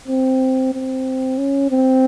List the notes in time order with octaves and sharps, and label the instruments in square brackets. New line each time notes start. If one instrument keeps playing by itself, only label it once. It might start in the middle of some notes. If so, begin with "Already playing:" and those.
[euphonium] C4
C4
C#4
C4